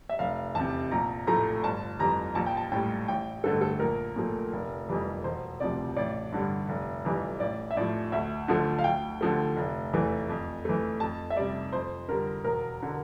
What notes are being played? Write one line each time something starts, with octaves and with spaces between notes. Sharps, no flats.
E5
F1 F5
E2 C3 A5
A#1 A#5
A2 F3 A3 A#5
G1 A5
F2 E3 G3 A#5
A#1 A5
G5
A5
A2 G3 G5
A1 G5
G2 D3 A3 A4
A4
A#1 A#4
A#2 F3 A3
F1
F2 E3 G3
E1 C5
D2 C3 F3 D5
A1 D5
G2 D3 G3
F1
F2 E3 G3
A1 D5
E5
A2 F3 D5
D2 E5
D3 F3 A3
F5
D2 G5
D3 F3 A3
F1
E2 E3 A3
F2
E3 A3
F2 A5
E5
C3 G3 D5
F2 C5
D3 G3 A#4
E1 A#4
D3